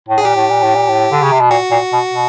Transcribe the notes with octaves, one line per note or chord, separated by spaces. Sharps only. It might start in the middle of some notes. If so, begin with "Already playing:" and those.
A2
G#4
A#2 G4
A2
A#2
A2
A#2
A2
D3
C#3
C3
B2
A#2 F#4
A#2
B2
B2